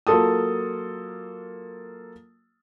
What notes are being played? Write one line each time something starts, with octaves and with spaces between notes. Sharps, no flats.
F#3 A#3 F4 A4 A5 D#6